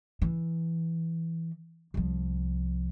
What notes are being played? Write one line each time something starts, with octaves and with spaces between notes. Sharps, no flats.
E3
C2 F3